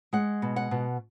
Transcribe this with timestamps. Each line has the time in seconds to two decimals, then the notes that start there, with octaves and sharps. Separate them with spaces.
0.13 G#3 F#5
0.42 B2
0.56 F#5
0.71 B2